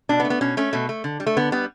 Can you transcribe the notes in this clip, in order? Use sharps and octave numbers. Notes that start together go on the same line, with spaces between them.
B2 D4
B3
A3
B3
B2 C#4
A3 C#4
B2 A3
A3
D3
G3
A3
D3 B3
G3 B3